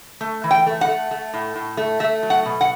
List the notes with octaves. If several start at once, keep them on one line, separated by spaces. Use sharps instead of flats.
A3
E3
G5
A3
F#5
A3
A3
A2
A2
A3
A3 E5
F#3
F#5
B2
F#5